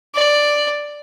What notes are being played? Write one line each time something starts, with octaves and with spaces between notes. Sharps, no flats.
D5